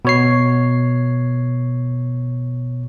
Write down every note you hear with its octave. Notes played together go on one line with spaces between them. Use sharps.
B2 C#5 C7